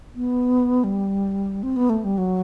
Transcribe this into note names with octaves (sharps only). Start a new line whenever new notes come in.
B3
G3
C4
B3
A3
G3
F#3